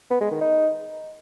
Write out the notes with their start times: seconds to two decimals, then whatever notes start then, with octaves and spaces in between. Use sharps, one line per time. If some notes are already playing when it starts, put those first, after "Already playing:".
0.10 B3
0.21 G#3
0.31 D#3
0.41 D#4